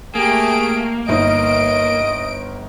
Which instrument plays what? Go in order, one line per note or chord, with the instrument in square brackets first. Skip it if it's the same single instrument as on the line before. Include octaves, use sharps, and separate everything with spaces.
[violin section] A3 G4 D7 [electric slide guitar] A#3 [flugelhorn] G#4
[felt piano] G1 D#4 [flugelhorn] D#5 [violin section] D7